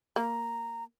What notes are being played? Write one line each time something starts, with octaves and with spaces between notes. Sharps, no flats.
A#3 A#5